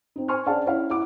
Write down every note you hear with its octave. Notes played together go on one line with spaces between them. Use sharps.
C4 D#4
C5 G#5 C6 C#6 F6
C#4 D4 G#4 D5 F5 A5
C#4 E4 C#5 E5 F5
E4 F#5 D6